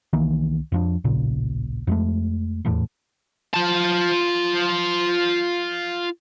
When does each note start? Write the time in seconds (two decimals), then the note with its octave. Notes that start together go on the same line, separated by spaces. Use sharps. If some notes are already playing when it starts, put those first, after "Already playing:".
0.13 C2 D#3 E3 A#3
0.72 F2 F3 D4
1.04 D1 A#1 A#2 C#3
1.87 F2 G#3 A3
2.65 D#1 E2 A2
3.54 F4 A5